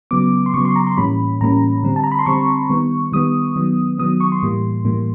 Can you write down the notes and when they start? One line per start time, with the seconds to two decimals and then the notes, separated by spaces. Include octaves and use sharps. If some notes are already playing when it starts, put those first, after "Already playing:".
0.11 C#3 F#3 B3 D6
0.46 C6
0.54 C#3 F#3 B3 C#6
0.65 C6
0.76 A#5
0.87 C6
0.97 A2 E3 G3 A#3 C#4 B5
1.41 A2 E3 G3 A#3 C#4 A#5
1.83 D3 G3 C4
1.96 A5
2.04 A#5
2.12 B5
2.19 C6
2.26 D3 G3 C4 C#6
2.70 D#3 G3 B3
3.12 D#3 G3 B3 D#6
3.56 D#3 F#3 B3
3.98 D#3 F#3 B3 D#6
4.20 C#6
4.32 C6
4.42 A2 E3 G3 A#3
4.85 A2 E3 G3 A#3